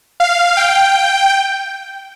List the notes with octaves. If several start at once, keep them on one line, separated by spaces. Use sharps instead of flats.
F5
G5